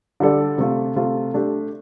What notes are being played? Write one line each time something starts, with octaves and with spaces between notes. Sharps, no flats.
D3 G3 D4 A4 D5
C3 A3 F4
C3 A3 F4
A3 D4 G4